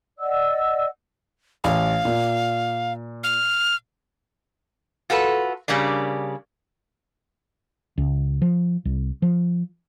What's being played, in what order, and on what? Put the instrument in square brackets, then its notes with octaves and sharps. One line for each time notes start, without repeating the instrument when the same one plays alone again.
[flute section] D5 D#5 F#5 E6
[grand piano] A1 [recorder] F5
[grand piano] A#2
[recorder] F6
[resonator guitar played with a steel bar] F4 F#4 A4 B4
C#3 G3 A#3 D4
[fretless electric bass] C#2
F3
C2
F3